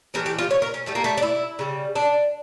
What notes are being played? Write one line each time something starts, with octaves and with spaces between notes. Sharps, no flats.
A2 E3 G3 A#4
G4
F4
C#5
A#4
C#4
A2 G3 A3
A#3
A3
D4
E4
C#3 G3
D4